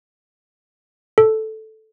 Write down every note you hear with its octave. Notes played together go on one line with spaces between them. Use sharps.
A4